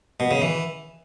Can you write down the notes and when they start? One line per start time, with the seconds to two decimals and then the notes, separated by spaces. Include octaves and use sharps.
0.20 B2
0.31 C#3
0.42 E3